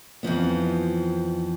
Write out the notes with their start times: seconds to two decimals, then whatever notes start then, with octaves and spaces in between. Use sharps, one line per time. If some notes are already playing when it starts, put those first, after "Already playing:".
0.23 F2 E3 F3 B3